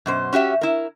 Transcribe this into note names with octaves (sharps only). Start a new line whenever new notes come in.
F#2 B2 C5
C#4 F#4 G4 E5
E4 A#4